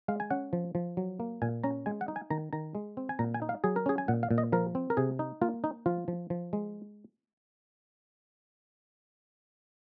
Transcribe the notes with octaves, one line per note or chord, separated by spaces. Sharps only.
G#3 F5
G#5
C#4 F#5
F3
F3
F#3
A#3
A#2 G#5
C#4 A#5
G#3 G#5
F#5
D#4
G#5
D#3 A#5
D#3 A#5
G#3
C4
G#5
A#2 A#5
G#5
D#4
F5
F#3 G#4
A#4
C#4 G#4
G#5
A#2 F#5
F5
A#2
D#5
F3 A#4
C4
A#4
C3 G#4
D#4
A#3 F4
D#4
F3 F4
F3
F3
G#3